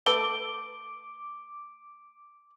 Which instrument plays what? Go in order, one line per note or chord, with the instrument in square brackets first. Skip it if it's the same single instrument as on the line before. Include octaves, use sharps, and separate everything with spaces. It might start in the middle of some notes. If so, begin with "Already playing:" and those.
[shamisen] A3 A4 B4 [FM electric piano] D6 [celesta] G7